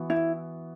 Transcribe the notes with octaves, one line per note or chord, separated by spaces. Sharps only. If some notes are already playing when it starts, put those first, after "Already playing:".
Already playing: E3 B3 F#4
E4